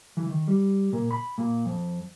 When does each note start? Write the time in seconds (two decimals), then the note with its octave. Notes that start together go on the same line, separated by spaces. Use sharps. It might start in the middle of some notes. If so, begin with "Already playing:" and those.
0.17 E3
0.29 D#3
0.48 G3
0.93 A#2
1.11 B5
1.38 A#2
1.66 F2